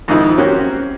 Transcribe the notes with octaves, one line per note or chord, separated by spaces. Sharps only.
F2 G#2 D#3 D#4 E4
F#3 A#3 C4 C#4 F#4 G4